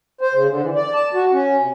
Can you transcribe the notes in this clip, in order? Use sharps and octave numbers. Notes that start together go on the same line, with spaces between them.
C5
C#3
D3
E3
D5
A5
F#4
C#4
C3